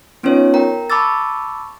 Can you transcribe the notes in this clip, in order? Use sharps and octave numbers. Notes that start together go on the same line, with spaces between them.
B3 C#4 D#4 F4 C#5
A#4 G5 A#5
A5 B5 C#6 D6 E6 A6